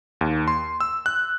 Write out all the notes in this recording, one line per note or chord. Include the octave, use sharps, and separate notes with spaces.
D#2
C6
E6
F#6